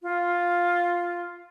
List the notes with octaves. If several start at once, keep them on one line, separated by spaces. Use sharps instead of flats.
F4